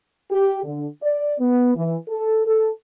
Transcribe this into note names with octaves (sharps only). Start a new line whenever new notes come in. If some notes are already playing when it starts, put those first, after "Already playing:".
G4
D3
D5
B3
E3
A4
A4